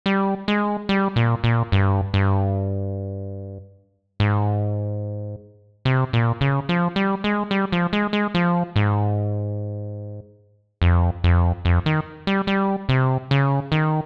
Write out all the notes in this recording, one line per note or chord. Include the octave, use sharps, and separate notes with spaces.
G3
G#3
G3
A#2
A#2
G2
G2
G#2
C3
A#2
C#3
F3
G3
G#3
G3
F3
G#3
G#3
F3
G#2
F2
F2
F2
D#3
G3
G3
C3
C#3
D#3